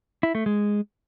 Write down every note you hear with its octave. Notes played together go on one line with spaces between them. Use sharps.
E4
A3
G#3